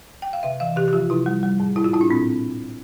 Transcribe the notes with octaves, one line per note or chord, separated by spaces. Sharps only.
G5
F5
C3 E5
E3 F5
C3 G4
G4
F3 F4
C3 E4
G3
G3
A2
A2 E4
F4
A2 E4
D4
A#2 C4